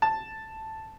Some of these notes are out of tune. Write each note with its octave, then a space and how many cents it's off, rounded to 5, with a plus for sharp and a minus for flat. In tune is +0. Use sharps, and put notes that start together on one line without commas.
A5 +0